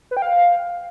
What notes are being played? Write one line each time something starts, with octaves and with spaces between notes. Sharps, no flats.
B4
G5
F5